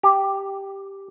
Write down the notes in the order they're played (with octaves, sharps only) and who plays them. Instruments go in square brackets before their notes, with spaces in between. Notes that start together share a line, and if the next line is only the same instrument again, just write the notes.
[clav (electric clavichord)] G4